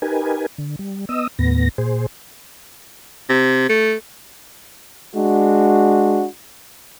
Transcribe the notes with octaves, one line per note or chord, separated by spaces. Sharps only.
D#4 G4 A#4 B4 G#5
D3
G3
B3 D#5 D#6 E6
D#2 A2 B3 A#6
A#2 G#4 C5
C3
A3
G#3 D4 F#4